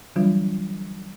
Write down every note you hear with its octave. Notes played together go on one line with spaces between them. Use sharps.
D3 E3 F#3 G3 D4 F4